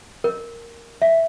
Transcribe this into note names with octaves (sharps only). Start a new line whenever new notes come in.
A#4
E5